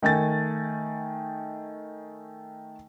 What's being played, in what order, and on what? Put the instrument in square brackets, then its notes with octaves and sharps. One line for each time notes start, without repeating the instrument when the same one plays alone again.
[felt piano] D#3 A3 G#5 A6